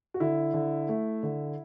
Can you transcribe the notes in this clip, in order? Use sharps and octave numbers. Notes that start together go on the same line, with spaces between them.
F#4
D3 E4
D3
A3
D3